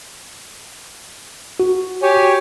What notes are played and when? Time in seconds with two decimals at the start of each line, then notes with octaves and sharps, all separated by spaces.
1.60 F#4
2.03 G4 C#5 G#5